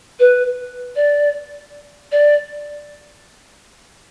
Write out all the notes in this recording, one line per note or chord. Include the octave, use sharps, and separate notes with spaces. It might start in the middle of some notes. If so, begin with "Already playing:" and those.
B4
D5
D5